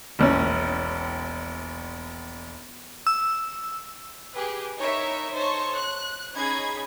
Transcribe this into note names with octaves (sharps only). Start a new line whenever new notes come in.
E1 A#1 C#4
E6
G4 G#4 B4
D#4 E4 A#4 C#5 E5
D#4 A4 C5 C#5 C#6
F#6
C#4 D#4 G#4 B5 G#6